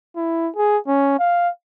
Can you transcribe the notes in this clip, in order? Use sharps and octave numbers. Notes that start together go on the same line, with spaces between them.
E4
G#4
C#4
F5